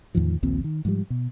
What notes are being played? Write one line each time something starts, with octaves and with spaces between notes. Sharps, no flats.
E2 A2 D#3 F3
A#1 D#2 A#2 C4
D#3
G#2 F3 G3
B2